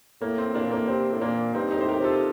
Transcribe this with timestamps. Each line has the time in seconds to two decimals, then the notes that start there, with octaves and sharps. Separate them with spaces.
0.21 A2 A#3
0.38 C4
0.55 A2 A#3 D4
0.64 A#2
0.72 A2 A#3
0.88 C3 C4
1.13 A2
1.21 A#2 A#3 D4
1.54 G2 C4 D#4
1.71 D#4 G4
1.77 A2 C5
1.89 G4 A#4
2.00 C3 F4 A4